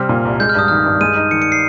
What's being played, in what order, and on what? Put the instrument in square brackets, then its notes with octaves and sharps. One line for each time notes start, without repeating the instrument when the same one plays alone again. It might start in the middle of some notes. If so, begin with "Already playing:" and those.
Already playing: [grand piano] C3 G3 C4 [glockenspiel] F6
[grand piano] A#2
C2
[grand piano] G#3 [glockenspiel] G6
[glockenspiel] F6
[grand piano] G2 [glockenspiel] D#6
[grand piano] D#3 [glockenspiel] F6
[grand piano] G2
[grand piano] G#3 [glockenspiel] D#7
[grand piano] D#4
[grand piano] D#3 [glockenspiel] C#7
[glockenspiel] C#7
C7